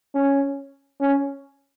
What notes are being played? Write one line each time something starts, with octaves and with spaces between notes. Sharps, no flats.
C#4
C#4